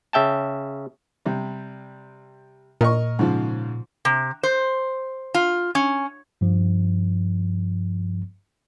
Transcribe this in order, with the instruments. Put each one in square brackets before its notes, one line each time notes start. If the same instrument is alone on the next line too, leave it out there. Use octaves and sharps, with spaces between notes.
[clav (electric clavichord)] C#3 E5 G5 A5
[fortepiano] C3 G3
[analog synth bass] A#2 [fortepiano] A#4 D#5 C#6
[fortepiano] G#2 C#3 F3
[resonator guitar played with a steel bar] C3
C5
F4
C#4
[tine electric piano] G2 F3